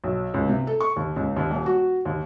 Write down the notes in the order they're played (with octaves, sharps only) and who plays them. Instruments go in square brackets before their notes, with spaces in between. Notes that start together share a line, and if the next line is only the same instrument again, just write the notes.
[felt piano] B1
C#2
C3
A4
C#6
D#2
C#2
D#2
D#1
F#4
D#2